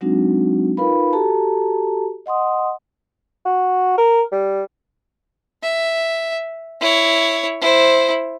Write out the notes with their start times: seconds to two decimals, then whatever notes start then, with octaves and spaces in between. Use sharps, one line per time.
0.01 F#3 G#3 C4 D4 D#4 F#4
0.77 D#4 F4 A#4 B4 F5 B5
1.13 F#4 G4 A4 A5 A#5
2.26 D#5 F#5 C6 D#6
3.45 F#4
3.98 A#4
4.32 G3
5.63 E5
6.81 E4 C#5
7.61 E4 C5